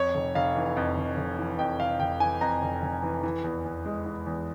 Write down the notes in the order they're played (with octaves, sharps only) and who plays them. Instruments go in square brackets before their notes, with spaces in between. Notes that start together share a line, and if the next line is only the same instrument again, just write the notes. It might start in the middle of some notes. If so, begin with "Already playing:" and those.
Already playing: [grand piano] F2 C#5
F1
F1 F5
E3
F2
F1
F1
E3
F2 G5
F1 F5
F1 G5
E3 G#5
F2 A#5
F1
F1
E3
E3
E2
E2
G#3
E3
E2